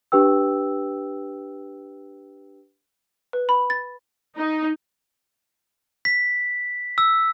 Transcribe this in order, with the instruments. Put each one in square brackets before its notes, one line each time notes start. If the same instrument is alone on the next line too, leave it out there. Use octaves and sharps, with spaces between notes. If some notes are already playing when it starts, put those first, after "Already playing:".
[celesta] D4 G4 B4 G5 E6
[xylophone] B4
B5
A6
[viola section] D#4
[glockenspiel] B6
E6